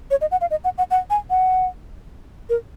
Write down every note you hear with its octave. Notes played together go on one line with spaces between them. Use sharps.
C#5
D#5
F#5
F5
D#5
F#5
F#5
F#5
G#5
F#5
A#4